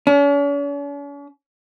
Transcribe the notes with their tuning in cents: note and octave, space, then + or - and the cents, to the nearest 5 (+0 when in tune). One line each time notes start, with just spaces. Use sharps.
C#4 +45